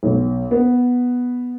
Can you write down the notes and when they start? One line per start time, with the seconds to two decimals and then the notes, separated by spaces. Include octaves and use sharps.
0.03 B1
0.51 B3